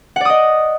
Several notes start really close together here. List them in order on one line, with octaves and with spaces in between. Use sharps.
F#5 D5 D#6 D#5